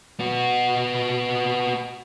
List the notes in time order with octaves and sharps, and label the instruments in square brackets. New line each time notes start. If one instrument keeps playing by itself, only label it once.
[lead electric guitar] B3 F#4